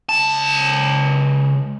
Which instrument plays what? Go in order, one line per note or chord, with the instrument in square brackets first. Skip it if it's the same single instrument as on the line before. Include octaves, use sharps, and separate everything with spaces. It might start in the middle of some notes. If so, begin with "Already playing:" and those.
[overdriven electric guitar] C#2 A5